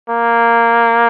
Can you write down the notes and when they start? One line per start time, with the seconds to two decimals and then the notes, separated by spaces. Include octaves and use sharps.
0.10 A#3